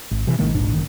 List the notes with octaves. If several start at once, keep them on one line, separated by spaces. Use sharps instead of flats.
G#1
C3 E3
A1 D#3 G#3 A#3
F1 A#1 G#2 D4
F#1 D#3